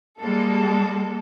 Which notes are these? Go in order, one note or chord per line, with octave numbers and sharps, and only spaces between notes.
G3 G#3 A#3 A4